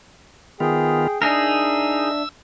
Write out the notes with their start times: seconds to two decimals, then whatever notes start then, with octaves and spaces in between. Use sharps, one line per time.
0.60 D#3 B3 F4 G#4 G5
1.22 D4 D#4 G#4 A#4 E5 E6